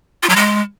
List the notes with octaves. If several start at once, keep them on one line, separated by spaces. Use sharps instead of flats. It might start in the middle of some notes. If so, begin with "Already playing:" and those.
F4
F#3
G#3